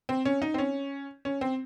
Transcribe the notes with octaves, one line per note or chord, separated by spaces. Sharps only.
C4
C#4
D#4
C4
C#4
C#4
C4